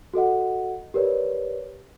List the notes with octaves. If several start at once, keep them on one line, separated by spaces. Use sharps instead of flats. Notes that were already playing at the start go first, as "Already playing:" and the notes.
F#4 A4 D#5 F#5
G4 A#4 B4 C#5 D5